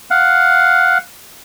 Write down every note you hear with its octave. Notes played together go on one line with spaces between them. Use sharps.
F5 F#5